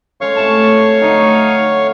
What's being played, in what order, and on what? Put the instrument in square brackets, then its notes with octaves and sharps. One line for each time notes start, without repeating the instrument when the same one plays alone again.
[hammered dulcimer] G#3 C#4 A4 [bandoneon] C#5 F5 C#6
[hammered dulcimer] A2 C3 [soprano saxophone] A5
[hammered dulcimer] D3 F#3 A3 [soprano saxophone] D#4